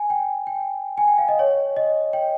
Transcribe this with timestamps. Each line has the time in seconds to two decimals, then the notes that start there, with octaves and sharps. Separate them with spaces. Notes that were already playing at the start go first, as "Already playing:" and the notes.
Already playing: G#5
0.10 G5
0.47 G5
0.98 G#5
1.08 G5
1.18 F5
1.28 D#5
1.39 C#5
1.76 D#5
2.13 G5